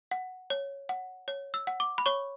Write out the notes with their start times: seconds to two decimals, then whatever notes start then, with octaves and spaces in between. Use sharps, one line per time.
0.11 F#5
0.50 C#5
0.89 F#5
1.28 C#5
1.54 E6
1.67 F#5
1.80 D6
1.98 B5
2.06 C#5 C#6